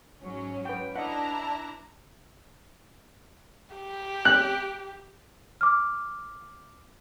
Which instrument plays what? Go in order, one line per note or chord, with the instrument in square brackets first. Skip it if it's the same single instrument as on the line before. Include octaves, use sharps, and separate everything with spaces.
[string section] G#2 F#3 C#4
[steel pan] B4 G5 [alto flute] F#5
[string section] D4 E4 A#5 [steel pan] D#5 E5 F#5 [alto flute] A5
[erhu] G4
[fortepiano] F#6
[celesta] D6 F6